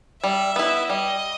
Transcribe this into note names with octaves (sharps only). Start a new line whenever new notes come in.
G3 E5
B3 E4
G3 D#5